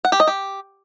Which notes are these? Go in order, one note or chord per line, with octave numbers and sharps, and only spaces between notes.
F#5
G4
D#5
G4